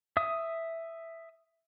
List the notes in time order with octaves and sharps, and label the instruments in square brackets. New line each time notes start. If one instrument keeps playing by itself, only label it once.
[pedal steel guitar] E5 D#6